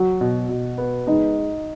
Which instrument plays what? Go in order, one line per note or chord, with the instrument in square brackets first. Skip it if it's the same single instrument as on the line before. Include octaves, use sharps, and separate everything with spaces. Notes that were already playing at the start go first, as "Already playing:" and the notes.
Already playing: [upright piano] F#3 [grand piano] F#4
[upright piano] B2
B2
B3
[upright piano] G#3 [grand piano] D#4